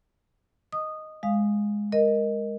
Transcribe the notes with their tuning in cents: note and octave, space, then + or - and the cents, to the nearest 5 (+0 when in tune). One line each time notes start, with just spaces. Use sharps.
D#5 +0 D#6 -15
G#3 +0 F5 +0 D#6 -10
A#4 +0 D#5 +0